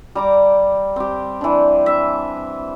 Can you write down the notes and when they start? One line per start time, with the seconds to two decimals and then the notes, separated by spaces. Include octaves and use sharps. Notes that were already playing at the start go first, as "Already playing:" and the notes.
0.15 G3 A#5 D6
0.96 C4 G4
1.41 E3 D4
1.86 E5